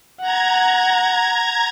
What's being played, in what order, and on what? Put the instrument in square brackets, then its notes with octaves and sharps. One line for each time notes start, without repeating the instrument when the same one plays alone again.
[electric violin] F#5 [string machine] A#5 G#6